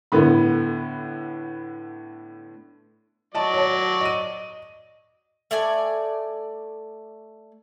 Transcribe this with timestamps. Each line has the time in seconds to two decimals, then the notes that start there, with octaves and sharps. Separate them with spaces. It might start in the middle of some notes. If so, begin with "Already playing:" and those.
0.12 A2 D3 B3 B5
3.35 F#3 D5 D#5 A5
3.54 C#5 A5
4.01 D#5 D#7
5.51 A3 D5 G#5